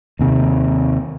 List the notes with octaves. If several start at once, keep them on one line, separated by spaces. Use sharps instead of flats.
D#2 C3